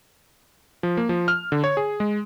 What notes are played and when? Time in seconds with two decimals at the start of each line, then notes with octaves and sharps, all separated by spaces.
0.83 F3
0.97 A#3
1.09 F3
1.28 F6
1.52 D3
1.64 C#5
1.77 G#4
2.00 G#3